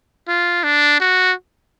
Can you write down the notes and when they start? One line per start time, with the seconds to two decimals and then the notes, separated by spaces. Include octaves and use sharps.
0.28 F4
0.64 D4
1.00 F#4